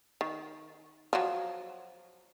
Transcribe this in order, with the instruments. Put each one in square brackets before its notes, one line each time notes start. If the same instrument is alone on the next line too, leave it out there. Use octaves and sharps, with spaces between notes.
[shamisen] D#3
F3 F#3